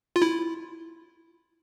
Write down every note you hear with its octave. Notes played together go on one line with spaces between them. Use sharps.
F4
E4